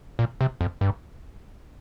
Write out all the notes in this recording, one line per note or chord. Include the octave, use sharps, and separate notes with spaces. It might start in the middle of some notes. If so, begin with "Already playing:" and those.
A#2
C3
F2
G2